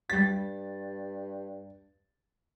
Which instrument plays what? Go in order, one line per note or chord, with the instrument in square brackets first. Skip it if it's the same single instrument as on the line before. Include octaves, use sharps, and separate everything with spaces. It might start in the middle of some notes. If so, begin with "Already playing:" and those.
[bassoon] G2 [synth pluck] G3 B6 [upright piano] A6